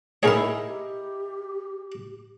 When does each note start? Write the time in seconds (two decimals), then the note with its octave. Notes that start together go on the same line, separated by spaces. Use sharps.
0.23 D#4 E4 G#4 A#4 C#5 D#5
0.64 G4